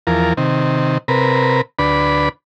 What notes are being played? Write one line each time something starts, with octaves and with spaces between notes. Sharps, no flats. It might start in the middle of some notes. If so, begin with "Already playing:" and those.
E2 F3 A#4
C3 D#3
C3 A#4 B4
D2 D4 B4 B5